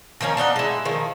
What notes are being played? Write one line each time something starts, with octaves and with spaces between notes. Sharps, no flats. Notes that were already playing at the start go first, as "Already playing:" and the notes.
D#3 F3 A#3 C#4
D4 D#4 D#5 F#5
G#3 E4
D#3 F3